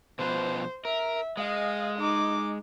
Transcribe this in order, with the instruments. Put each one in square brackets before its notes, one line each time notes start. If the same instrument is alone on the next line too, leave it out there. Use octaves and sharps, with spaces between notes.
[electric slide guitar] B2 F3 B4 [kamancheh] C5
[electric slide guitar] A#4 [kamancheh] E5
[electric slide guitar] G#3 [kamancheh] D#5 F5
[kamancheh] D#4 D6